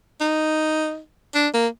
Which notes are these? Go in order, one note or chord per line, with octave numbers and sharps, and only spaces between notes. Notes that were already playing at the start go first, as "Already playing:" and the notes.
D#4
D4
A#3